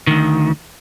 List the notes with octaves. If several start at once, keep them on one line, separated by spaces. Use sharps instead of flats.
D2 D#3